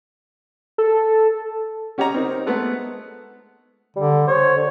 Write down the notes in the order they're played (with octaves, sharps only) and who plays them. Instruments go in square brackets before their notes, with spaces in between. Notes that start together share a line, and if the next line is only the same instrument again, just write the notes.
[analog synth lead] A4
[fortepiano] C#4 G4 C#5 D#5 A#5
C4 D#4 A#4
G#3 A3 B3 B4
[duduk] D3 [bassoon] G3
[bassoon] C5 [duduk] C#5
[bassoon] D3